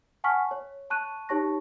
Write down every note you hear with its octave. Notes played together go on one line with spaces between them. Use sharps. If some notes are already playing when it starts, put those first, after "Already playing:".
F#5 G#5 A5 C#6 F6 B6
C#5
A5 C#6 F#6 D#7
D#4 G4 C#5 A5 C#6 A#6